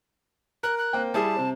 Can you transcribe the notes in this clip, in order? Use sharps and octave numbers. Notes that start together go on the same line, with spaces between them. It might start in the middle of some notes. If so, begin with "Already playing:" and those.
A#4 F#6
F#6
A#3 C4 G5
G3 E4 G#4 A5
C3 C4